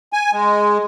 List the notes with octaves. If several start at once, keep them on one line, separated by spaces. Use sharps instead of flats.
G#5
G#3